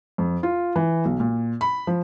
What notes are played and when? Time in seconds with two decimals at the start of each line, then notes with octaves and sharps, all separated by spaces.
0.18 F2
0.43 F4
0.76 E3
1.05 B1
1.20 A#2
1.61 B5
1.87 F3